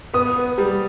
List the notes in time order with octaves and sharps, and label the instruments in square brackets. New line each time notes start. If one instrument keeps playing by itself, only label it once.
[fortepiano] B3 [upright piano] D#6
[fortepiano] B3
G3